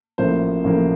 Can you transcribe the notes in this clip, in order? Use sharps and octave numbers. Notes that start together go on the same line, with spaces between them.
A1 A2 F3 A#3 C5
A1 A2 F3 A#3